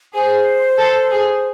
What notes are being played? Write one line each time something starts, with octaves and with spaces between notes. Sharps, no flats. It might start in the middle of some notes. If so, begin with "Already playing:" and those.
G#4 C5
A4
G#4